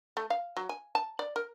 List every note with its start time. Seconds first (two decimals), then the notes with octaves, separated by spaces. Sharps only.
0.17 A3
0.30 F5
0.57 F#3
0.69 G#5
0.95 A5
1.19 D5
1.36 A#4